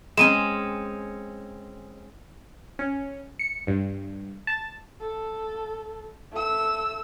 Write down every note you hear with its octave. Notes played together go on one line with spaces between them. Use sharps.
G#3 C4 C#4 D#7 E7
C#4
C#7
G2
A5
A4
A3 E6